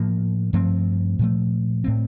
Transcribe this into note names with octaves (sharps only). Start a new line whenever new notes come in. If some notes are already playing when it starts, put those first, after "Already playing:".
Already playing: A2 F3 A#3
G2 F3 A3 C4
A#2 F3 A3
A2 A3 C4